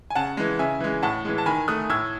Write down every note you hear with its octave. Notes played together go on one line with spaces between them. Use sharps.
G#5
C#3 F#5 A5
E3 G#3
C#3 E5 G#5
E3 G#3
A2 F#5 A5
E3 G#3
A5
D#3 G#5 B5
A3 D#6 F#6
A2 E6 G#6